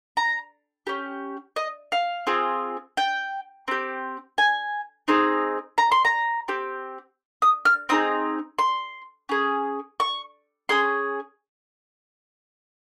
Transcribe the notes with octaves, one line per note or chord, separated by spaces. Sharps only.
A#5
C#4 G4
D#5
F5
C4 F4 G#4
G5
C4 G4
G#5
C4 D#4 G#4
A#5
C6
A#5
C4 G4
D#6
F6
C4 D#4 G#4 D#6
C6
C#4 G#4
C#6
C#4 G#4 C6